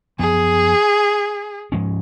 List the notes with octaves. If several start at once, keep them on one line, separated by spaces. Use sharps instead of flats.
F#2 F3 B3 G#4
G#2 F3 G#3 C#4